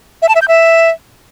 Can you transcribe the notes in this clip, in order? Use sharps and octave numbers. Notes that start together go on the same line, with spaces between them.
E5
A5
E5
G6
E5